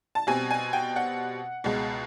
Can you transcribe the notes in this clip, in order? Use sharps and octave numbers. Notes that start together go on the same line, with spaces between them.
A5
B2 G3 C4 G#5
G#5
G5
F#5
C#2 B2 G#3